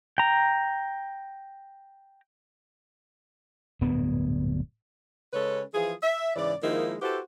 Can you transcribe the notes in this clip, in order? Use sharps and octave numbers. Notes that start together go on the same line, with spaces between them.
G5 A#5
D1 G2 A#2 B3
C#3 G#3 C#4 A4 B4 C#5
E3 F3 F4 G#4
E5
G#2 C#3 E3 D5
D#3 F3 G#3 A#3 D#4 E4
E4 F#4 G4 A4 B4 C5